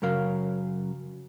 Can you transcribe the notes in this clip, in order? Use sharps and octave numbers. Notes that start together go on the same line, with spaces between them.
F#2 C#3 F#3 A#4 F5